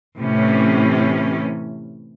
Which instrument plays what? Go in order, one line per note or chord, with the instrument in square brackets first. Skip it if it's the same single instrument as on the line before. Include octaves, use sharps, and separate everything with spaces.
[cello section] A2 C3 E3 C#4